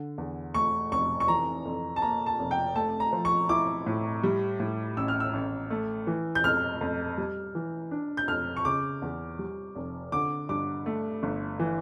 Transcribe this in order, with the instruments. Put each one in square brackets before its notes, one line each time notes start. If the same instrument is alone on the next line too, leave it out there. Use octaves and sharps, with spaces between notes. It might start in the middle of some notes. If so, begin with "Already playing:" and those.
Already playing: [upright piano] D3
E2
[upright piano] A3 [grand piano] C#6
[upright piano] F1 [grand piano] C#6
[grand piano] C#6
[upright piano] E3 [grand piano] A#5
[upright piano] F2
[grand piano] A5
[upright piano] A#3 [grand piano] A#5
[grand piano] A5
[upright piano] F1
[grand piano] G5
[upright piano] A3 [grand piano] A5
[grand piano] A#5
[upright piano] F3
[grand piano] C#6
[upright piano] E4 [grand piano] D6
[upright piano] A2
G3
A2
[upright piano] A1 [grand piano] E6
[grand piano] F6
E6
[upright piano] A1
A3
E3
[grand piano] G6
[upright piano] F2 [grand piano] F6
[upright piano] F2
G3
E3
D4
[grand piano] G6
[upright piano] F2 [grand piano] F6
[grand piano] C#6
[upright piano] C#3 [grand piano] D6
[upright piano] E2
G3
F1
[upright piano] D3 [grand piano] D6
[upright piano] G2 [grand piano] D6
[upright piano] A3
G1
E3